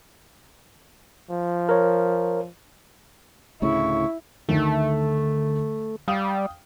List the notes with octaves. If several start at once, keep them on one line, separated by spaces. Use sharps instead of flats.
F3
A#4 C#5
D2 A2 C#3 E4 C#6
D2 D#3 A3
G3 F5 G5 D#6